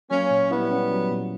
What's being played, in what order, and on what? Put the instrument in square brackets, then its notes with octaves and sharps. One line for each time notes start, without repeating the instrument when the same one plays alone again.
[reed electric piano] F#3 [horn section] A#3 C#4
[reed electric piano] A#2
[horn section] G3 B3 [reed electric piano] E4
[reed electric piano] C#4
F#3
A#2